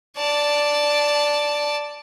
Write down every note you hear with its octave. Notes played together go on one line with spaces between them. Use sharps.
D5 A5